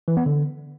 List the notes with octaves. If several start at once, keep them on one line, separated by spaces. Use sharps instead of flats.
E3
B3
D3